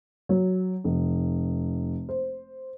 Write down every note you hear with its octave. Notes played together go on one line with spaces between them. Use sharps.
F#3
F1
C5